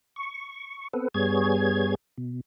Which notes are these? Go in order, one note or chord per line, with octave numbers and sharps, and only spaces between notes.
C#6
B3 C4 A4 B4
G2 G3 B3 G#4 C#5 G#6
B2